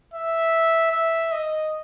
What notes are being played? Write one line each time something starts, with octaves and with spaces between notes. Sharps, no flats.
E5
E5
D#5